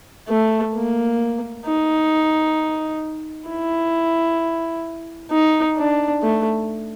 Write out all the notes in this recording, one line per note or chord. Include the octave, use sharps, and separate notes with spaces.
A3
A#3
D#4
E4
D#4
D4
A3